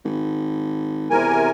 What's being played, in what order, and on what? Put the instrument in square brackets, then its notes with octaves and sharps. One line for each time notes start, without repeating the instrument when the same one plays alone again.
[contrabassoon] G#1
[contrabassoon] E2 [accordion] C3 A#4 G#5